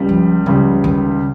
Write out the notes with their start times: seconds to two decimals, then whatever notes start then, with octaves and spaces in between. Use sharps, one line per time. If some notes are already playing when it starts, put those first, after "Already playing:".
Already playing: C#2 C#3 G3
0.09 F3
0.46 C#2 C#3 F3 G3
0.84 D#3